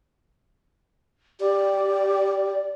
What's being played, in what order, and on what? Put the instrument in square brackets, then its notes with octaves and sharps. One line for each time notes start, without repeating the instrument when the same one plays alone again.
[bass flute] G4 [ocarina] D5